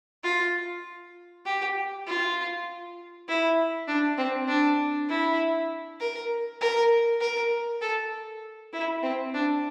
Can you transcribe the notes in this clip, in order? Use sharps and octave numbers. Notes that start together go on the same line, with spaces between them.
F4
G4
F4
E4
D4
C4
D4
E4
A#4
A#4
A#4
A4
E4
C4
D4